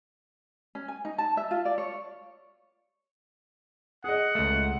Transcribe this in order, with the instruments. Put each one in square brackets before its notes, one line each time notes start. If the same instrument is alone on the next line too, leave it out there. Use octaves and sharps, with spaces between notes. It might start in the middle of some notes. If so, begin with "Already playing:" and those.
[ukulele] C#4
G#5
D#4
A5
E5
F4
D5
C#5
[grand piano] G#4 D#5 [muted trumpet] F#5
[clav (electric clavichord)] C#2 A3